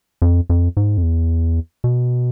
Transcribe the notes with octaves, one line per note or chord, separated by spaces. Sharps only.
F2
F2
G#2
F2
E2
B2